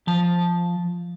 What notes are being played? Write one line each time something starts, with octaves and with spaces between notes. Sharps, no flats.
F3 A5